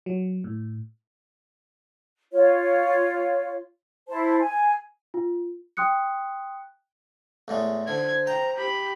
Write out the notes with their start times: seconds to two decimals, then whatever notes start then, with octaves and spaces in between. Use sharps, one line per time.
0.06 F#3
0.44 A2
2.33 F4 C#5
4.09 E4 C5 A5
4.40 G#5
5.14 F4
5.77 G5 C6 D#6 F#6 C#7
7.48 E2 A2 G#3
7.88 D3 C5 G#6
8.27 G5 A#5
8.57 G4 B5